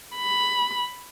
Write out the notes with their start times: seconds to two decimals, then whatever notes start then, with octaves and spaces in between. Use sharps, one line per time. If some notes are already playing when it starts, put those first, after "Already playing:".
0.16 B5